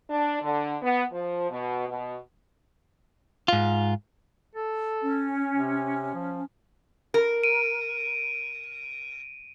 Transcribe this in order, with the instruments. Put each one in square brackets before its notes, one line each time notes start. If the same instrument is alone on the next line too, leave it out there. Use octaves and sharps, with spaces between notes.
[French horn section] D4
D3
B3
F3
B2
B2
[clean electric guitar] G#2 F4
[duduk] A4
[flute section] C#4
[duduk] C3
F3
[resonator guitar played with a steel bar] A#4
[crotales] D7 D#7